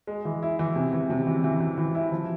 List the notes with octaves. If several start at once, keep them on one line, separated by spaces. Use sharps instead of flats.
G#3
E3
E4
E3
C3
E3
C3
E3
E3
E3
E3
E4
F3